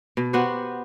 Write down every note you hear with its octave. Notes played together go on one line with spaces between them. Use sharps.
B2
B3 F#4 G4 C5